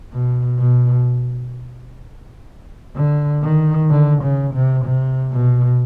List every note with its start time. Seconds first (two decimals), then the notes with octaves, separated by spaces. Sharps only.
0.13 B2
0.59 B2
2.96 D3
3.43 D#3
3.90 D3
4.22 C#3
4.54 C3
4.85 C3
5.31 B2